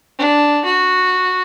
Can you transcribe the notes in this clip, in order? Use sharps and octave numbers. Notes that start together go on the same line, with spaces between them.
D4
F#4